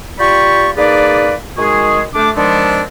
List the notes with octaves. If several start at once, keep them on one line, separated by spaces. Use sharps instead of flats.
F4 G4 D5 G5 B5 C#6
A#3 D#4 G#4 B4 D5
D#3 G#3 F#4 G#4
A3 D4 D6
D#3 F3 G#3 B3 C4 D4